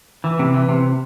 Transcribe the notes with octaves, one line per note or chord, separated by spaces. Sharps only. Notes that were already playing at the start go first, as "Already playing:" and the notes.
E3
C3
E3
C3